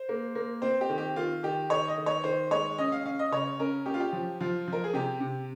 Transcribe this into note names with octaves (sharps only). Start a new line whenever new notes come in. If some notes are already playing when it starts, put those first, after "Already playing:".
Already playing: C5
A#3
A#3
C4 C5
G4
D#3
G4
D#3 F4
D#3 G4
D#3 C#5
D#5
D#3
C#5
D#3 C5
G#3 C#5
C#4 D#5
F5
C#4 F5
D#5
C#3 C#5
C#4 A#4
C#4 G4
F4
G4
F3
F3 F4
F3 A#4
G#4
C3 G4
C3